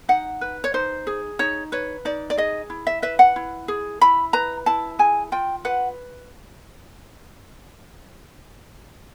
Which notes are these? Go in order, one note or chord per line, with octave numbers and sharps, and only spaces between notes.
D#4 F#5
B4
C#5
D#4 C5
G#4
D#4 C#5
B4 C#5
D#4 D5
D5
G#4 D#5
E4
E5
B4 E5
F#5
E4
G#4
E4 B5
B4 A#5
E4 A5
G#4 G#5
F4 G5
B4 F#5